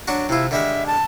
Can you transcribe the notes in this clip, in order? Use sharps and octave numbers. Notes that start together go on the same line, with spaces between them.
F#3 D4 F#4
C3 E4 F4
D3 G3 G#3 E5
A5